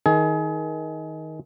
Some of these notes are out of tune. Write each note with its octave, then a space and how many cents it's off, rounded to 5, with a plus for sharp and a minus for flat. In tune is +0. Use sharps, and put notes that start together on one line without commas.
D#3 +20 G#4 +30